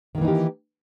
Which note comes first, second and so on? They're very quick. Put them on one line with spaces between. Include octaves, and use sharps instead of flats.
D#3 A#3 E3 D#4 G4